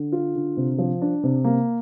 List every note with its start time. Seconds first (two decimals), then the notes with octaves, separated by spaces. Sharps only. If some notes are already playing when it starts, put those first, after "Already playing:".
Already playing: D3
0.12 F4
0.36 D3
0.57 C3
0.78 F3
1.02 D4
1.23 C3
1.44 A#3